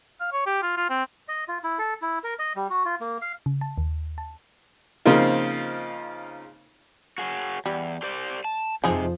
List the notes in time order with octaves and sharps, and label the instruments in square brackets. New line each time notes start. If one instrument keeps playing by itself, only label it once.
[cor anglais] F5
C#5
G4
F4
F4
C4
[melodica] D#5
F4
E4
A4
E4
A#4
D#5
G3
F#4
F4
A#3
F5
[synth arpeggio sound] C#3
A5
D#2
A5
[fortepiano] C#3 F3 A#3 C4 D#4 F4
[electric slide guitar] F#4 G#4 C#5
[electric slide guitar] E2 [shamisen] G3
[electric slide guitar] G4 C5 D5
A5
[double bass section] F2 F3 [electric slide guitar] C3 [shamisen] G#3 D#4 G#4